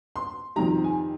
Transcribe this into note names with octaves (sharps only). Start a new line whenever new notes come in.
C6
F2 C3 D#3 G3 A#5
G#5